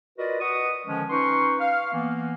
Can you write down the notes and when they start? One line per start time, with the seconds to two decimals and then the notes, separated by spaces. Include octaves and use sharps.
0.18 F4 F#4 A#4 B4 D5 D#5
0.41 B4 D#5 F#5 C#6 D#6
0.86 D3 D#3 F3 G#3 C#4
1.10 C#4 D#4 B4 C6 C#6
1.60 F5
1.93 E3 A#3 B3